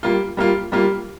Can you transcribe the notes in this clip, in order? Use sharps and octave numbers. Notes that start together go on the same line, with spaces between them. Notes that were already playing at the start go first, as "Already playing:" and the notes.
G3 A#3 F4
G3 A#3 F4
G3 A#3 F4